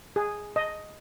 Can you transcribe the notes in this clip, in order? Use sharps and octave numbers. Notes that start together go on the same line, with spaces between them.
G#4
D#5